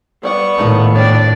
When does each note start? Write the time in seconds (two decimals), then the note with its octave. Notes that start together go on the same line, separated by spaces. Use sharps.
0.23 G3 B3 D5 F#5 C#6
0.58 A2 D#3 A3 D#4 F4
0.95 C4 D4 F4 C#5 D5